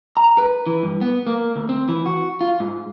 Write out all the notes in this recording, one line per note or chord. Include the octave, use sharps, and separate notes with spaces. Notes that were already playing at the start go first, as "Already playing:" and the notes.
A#5
B4
E3
G2
B3
A#3
D2
C4
E3
F#4
F4
G#2